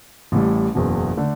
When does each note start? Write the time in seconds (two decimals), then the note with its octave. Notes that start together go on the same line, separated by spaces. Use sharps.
0.32 A1 A2 G3
0.75 F#1 E2 B2
1.17 D3 A3 D4